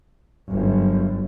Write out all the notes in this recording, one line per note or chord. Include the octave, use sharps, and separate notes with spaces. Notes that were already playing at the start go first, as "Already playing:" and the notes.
G1 F#2